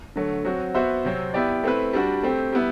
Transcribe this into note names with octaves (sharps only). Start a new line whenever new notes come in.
D3 F#3 A3
F#3 C4 F#4
B3 F#4 C5 E5
C3 F#3 C4
B3 E4 G4 D5
A3 C4 E4 B4
G3 D4 F#4
A3 C4 G4
G3 B3 E4